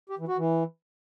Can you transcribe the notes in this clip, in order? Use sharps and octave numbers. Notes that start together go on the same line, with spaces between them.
G4
E3
F#4
E3